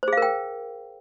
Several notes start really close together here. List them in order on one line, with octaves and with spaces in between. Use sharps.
C5 G#4 F5 A#4 G5